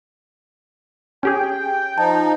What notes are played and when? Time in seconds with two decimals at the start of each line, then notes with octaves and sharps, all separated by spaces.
1.23 C#4 G4 G#4 G5
1.98 F3 D#4 A5